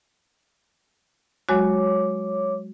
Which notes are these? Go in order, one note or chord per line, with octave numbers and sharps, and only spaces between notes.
F#3 G#3 F#4 C#5 D6